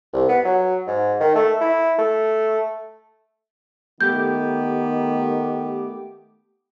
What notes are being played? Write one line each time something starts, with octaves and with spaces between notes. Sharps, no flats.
C2
B3
F#3
G#2
D#3
A3
E4
A3
D#3 A3 B3 G4 D6 G6